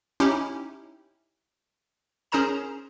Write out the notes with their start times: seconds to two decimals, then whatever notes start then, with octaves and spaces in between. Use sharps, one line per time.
0.20 C#4 D#4 E4 G4
2.32 C#4 G#4 A#4 C5 A#5 E7